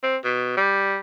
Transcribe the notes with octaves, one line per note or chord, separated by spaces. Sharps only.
C4
B2
G3